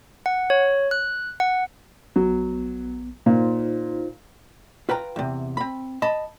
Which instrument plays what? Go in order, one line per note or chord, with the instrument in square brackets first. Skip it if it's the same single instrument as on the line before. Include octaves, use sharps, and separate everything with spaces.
[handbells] F#5
C#5
F#6
F#5
[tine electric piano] A#1 B3 [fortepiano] F#3
[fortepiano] A#2 [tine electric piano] D#4 F4 C5
[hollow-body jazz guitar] F4 B4 G5 A#5
E2 C3
C4 B5
D#5 A5 B5